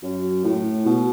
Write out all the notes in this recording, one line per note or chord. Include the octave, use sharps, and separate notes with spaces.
F#2
A2
B2